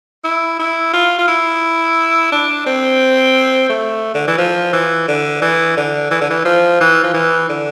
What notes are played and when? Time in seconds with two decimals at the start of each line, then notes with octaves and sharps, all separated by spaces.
0.24 E4
0.59 E4
0.93 F4
1.18 F4
1.28 E4
2.32 D4
2.66 C4
3.69 A3
4.14 D3
4.27 E3
4.38 F3
4.73 E3
5.08 D3
5.42 E3
5.77 D3
6.11 E3
6.21 D3
6.30 E3
6.45 F3
6.80 E3
7.04 F3
7.14 E3
7.49 D3